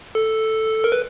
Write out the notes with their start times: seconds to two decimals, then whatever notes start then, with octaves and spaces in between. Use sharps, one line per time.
0.15 A4
0.84 A#4
0.92 B4